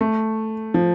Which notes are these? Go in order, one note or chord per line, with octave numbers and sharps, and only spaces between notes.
A3
F3